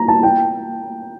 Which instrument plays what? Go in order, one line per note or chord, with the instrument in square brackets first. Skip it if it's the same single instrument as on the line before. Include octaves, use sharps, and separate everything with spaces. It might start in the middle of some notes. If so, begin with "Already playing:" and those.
Already playing: [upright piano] A#5
A5
G5